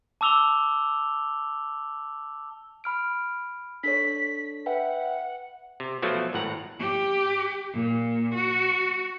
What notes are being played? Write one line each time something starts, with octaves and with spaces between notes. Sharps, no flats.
A5 D6 E6 F7 G7
B5 F6 D7
D4 A4 C#5 B6
B4 E5 F#5 G5
C3
B2 F3 F#3 A3
G#1 A2 F#5 A#5
G4
A#2
F#4